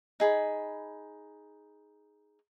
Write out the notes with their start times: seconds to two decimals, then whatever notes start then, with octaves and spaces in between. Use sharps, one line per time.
0.20 D#4 G#4 B5